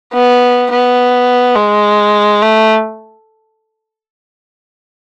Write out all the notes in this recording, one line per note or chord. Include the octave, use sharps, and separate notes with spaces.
B3
B3
G#3
A3